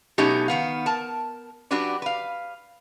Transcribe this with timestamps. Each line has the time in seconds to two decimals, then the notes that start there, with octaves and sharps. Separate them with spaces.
0.18 B2 F#3 A3 C#4 D#4 G4
0.48 D#3 B3 F5
0.86 A#4 A5
1.71 F#3 D4 F#4 G4 B4 D5
2.02 B4 F5